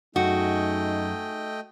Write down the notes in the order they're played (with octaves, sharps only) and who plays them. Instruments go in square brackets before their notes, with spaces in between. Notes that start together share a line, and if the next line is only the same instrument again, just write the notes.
[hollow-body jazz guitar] F#2 [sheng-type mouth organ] A3 D#5 G5 [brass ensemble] D#4 G#4 [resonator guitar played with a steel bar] F#4